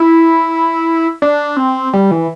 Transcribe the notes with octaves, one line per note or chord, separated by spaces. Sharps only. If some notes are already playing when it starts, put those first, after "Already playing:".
Already playing: E4
D4
C4
G3
E3